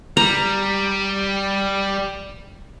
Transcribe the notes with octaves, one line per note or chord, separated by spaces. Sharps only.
G3 A#5